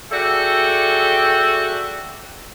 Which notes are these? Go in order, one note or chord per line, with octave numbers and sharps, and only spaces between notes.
F#4 G#4 A4 D5 E5 G5